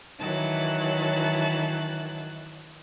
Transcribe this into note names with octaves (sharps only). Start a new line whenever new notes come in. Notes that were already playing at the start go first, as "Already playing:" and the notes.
D#3 E3 F#3 A5 F#6